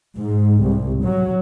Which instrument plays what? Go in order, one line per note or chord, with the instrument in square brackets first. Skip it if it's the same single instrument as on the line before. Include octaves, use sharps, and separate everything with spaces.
[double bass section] G#2
C2
F#3